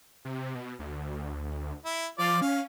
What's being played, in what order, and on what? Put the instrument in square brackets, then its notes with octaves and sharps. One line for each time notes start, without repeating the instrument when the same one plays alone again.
[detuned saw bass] C3
B2
D2
[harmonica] E4
[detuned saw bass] F3 [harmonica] F4 D5
[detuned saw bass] C#4 [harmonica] F5